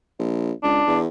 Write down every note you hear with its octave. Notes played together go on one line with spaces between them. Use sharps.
A#1
C#2 D4
E2